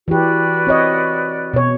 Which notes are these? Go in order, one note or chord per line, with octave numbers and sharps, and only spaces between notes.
E3 F#4 G4 B4 D5
C4 C#5 D#5
B2 C#5